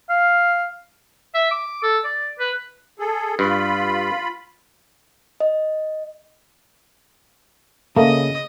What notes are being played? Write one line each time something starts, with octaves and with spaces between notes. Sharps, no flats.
F5
E5
D6
A4
D5
B4
G#4 A4
G2 F4 B5
D#5
C#3 A3 A#3 D#5 D#6